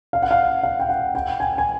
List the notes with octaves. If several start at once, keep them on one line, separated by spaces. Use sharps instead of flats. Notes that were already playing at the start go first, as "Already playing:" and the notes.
F5
F#5
F5
F5
G5
F#5
G5
G#5
G#5